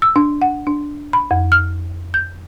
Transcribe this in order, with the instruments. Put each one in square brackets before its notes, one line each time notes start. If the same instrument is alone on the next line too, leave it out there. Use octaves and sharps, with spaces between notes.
[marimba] E6
D4
F#5
D4
B5
F2
F6
G6